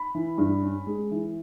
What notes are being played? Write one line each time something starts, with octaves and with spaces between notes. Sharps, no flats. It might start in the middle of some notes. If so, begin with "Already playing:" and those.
Already playing: B5
E3
G2
C#4
G#3
E3